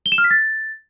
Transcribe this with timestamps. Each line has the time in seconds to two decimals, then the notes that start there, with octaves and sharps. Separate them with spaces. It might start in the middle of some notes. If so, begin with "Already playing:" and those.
0.06 G7
0.12 E7
0.18 F6
0.24 B6
0.31 A6